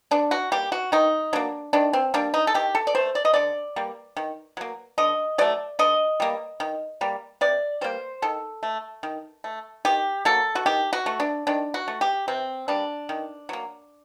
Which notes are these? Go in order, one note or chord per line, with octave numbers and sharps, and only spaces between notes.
D3 D4
F#4
G3 A#3 G4
F#4
D#3 D#4
F#3 A#3 D4
D#3 D4
C4
G3 A#3 D4
D#4
A4
D#3 G4
A4
D5
A3 C5
D5
D#5
D3 D5
G3 A#3
D#3
F#3 A#3
D3 D#5
F#3 A3 D5
D3 D#5
G3 A#3
D#3
G3 A#3
C3 D5
G3 A#3 C5
D#3 A4
A3
D#3
A3
D#3 G4
F#3 A#3 A4
F#4
D#3 G4
F#4
A3
D4
D#3 D4
F#4
A3
G4
C3 C4
G3 A#3 D4
D#3
F#3 A#3